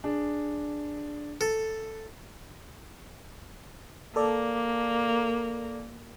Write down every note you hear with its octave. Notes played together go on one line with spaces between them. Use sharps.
D4 G#4
A4
A#3 A4 D5